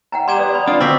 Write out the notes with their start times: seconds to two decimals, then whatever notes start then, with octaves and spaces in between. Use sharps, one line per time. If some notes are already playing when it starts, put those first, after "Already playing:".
0.12 F#5 G5 A#5
0.28 G3 A#5 C6 G#6 E7
0.39 B3 D5
0.54 D5 B5
0.68 D4 F4 D#6
0.80 D2 B2 C4 C6 D6 B6